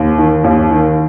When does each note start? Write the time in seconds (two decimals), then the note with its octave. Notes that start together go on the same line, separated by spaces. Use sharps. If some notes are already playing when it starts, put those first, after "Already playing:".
Already playing: D#2
0.18 D#3
0.44 D#2
0.71 D#3